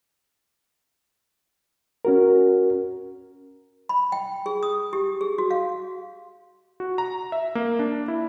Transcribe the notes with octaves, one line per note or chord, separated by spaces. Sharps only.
C#4 F#4 A#4
B5
G5
G#4
D#6
G4
G#4
F#4
F5
F#4
A#5
E5
A#3
D4
E4